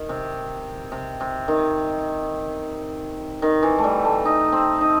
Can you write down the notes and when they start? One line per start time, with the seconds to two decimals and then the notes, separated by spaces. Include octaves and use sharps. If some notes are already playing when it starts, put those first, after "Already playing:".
Already playing: D#3
0.09 C3
0.92 C3
1.21 C3
1.48 D#3
3.42 D#3
3.63 E3
3.79 A3
3.84 G3
4.05 A3
4.25 D#4
4.52 C4
4.81 D#4